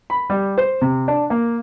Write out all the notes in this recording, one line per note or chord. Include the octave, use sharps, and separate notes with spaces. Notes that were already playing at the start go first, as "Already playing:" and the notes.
B5
G3
C5
C3
D4
A#3